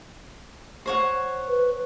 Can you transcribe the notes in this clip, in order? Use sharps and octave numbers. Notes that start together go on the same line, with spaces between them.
C5 C#5 F#5
B4